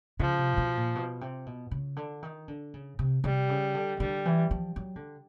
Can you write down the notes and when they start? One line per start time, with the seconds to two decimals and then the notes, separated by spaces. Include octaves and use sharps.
0.19 C#3 F3
0.38 C3
0.52 A#2
0.57 B2
0.77 A#2
0.95 B2
1.21 C3
1.46 B2
1.71 C#3
1.96 D3
2.23 D#3
2.48 D3
2.74 C#3
2.99 C3
3.24 C3 G3
3.49 C#3
3.74 D3
4.00 D3 G3
4.26 E3
4.51 F3
4.76 F#3
4.96 D3